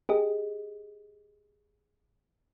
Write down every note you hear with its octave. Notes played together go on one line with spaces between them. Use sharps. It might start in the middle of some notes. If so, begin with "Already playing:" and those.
G4 G#4 D#5